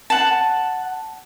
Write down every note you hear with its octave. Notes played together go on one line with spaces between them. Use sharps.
F#5 A5